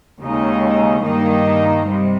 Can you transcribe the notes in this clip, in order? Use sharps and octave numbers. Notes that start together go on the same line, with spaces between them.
D#2 C#3 G#3 D#4
G2 D#3 A#3 D#4
C3 G3